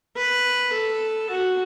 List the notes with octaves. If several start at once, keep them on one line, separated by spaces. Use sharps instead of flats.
B4
A4
F#4